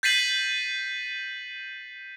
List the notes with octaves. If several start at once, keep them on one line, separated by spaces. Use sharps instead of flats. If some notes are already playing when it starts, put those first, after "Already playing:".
G6 A6 B6 C7 D#7 F#7